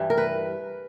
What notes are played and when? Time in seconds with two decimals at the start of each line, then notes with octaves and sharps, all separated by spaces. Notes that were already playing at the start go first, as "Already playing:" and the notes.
Already playing: G2 E3 G3
0.10 A#4
0.18 B4